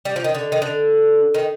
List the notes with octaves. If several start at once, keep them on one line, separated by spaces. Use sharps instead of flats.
G3
F3
D#3
D3
D#3
D3
D#3